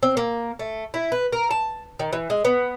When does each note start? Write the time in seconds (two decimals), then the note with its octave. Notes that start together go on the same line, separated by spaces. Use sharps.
0.03 C4
0.17 A#3
0.59 A3
0.94 E4
1.12 B4
1.32 A#4
1.51 A5
1.99 D#3
2.13 E3
2.30 G#3
2.45 B3